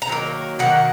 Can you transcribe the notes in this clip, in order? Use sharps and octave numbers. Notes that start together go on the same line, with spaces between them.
A#5
D#3 F#3 A#3
D#3 F#3 A#3 F#5